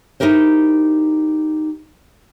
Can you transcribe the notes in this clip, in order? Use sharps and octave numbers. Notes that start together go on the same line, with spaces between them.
D#4 E4 G4 A#4 C5